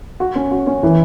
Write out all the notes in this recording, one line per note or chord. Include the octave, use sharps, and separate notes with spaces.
F#4
C#4
F#4
C#4
E3